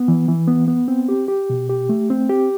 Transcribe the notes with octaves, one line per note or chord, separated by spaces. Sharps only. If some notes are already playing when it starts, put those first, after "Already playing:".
Already playing: B3
E3
E3
B3
B3
C4
G4
G4
B2
G4
A3
C4
G4